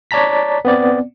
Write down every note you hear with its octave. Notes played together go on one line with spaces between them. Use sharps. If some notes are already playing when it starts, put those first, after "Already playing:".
C#5 D5 A5 A#5 B6
B3 C4 D5